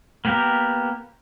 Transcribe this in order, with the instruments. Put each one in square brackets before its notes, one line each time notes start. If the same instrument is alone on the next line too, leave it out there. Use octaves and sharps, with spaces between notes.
[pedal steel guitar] A#3 B3 G4 A#4